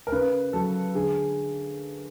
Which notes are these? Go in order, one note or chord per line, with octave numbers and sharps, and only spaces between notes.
A#4
C#3 B4
F#3 A4
D3 G#4